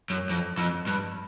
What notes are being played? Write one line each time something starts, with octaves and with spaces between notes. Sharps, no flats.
F#2
F2
F2
G2